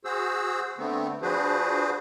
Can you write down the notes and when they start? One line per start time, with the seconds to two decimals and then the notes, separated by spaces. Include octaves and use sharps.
0.05 F#4 G#4 C5 E6
0.78 D3 A3 B3 C4
1.22 F3 D4 F#4 G#4 B4 C5